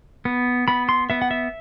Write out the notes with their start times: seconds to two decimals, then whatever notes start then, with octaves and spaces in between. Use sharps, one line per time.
0.25 B3
0.68 B3 B5
0.89 C6
1.10 B3 E5
1.22 F#5
1.31 E5